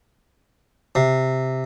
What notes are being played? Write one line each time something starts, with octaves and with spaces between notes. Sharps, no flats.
C3